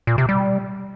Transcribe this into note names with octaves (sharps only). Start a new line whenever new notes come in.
A#2
C3
G3